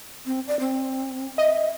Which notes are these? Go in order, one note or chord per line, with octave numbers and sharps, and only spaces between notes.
C4
D5
C4
D#5 E5